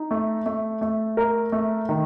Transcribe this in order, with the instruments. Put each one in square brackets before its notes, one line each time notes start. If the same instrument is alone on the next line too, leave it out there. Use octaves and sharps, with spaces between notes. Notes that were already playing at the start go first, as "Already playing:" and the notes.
Already playing: [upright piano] D#4
A3
A3
A3
A#4
A3
D#3